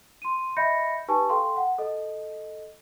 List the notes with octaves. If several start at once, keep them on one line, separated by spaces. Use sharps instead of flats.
C6 D#7
D#5 E5 B5 G6 A#6 C#7
D#4 G4 B4 G#5 A5 C#6
A4 F5 G5 C6
F#5
A4 D#5